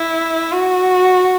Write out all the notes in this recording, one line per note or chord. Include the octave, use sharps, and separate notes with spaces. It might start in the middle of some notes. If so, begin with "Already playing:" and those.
Already playing: E4
F#4